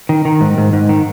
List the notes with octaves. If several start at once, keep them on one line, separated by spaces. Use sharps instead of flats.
D#3
D#3
G#2
G#2
G#2
D#3